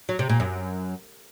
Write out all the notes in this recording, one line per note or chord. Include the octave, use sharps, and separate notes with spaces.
F#3
C3
A#2
F#2